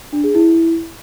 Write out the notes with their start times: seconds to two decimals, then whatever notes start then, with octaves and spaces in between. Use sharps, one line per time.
0.13 D4
0.24 G#4
0.35 E4